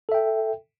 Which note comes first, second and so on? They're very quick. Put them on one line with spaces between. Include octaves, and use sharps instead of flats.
A4 E5 G5